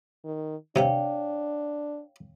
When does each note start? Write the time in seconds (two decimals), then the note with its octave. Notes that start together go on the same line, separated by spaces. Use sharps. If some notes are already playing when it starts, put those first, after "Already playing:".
0.25 D#3
0.76 C3 D4 C#5 F5 G5